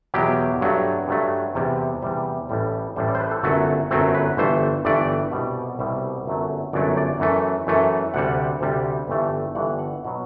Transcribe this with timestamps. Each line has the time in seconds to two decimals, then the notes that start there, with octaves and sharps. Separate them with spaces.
0.14 E2 B2 F#3 G4
0.61 G2 F#3 A3
1.08 G2 F#3 A3
1.55 E2 C3 G3
2.02 E2 C3 G3 C5
2.49 A1 A2 G3
2.96 A1 A2 G3 C5
3.08 D5
3.15 C5
3.20 B4
3.31 A4
3.43 G1 F#2 F#3 A3 F#4
3.91 G1 F#2 F#3 A3 C4
4.15 B4
4.37 G1 G2 E3 A3 C5
4.85 G1 G2 E3 A3 D5
5.32 C2 B2 G3
5.79 C2 B2 G3 E5
6.26 G1 F#2 F#3 A3
6.73 G1 F#2 F#3 A3 D5
6.97 D5
7.20 F#2 E3 A3
7.67 F#2 E3 A3
8.14 D2 C3 G3 F#5
8.61 D2 C3 G3
9.08 G1 G2 E3 A3
9.55 G1 G2 E3 A3 F#5
9.79 F#5
10.05 B2 F#3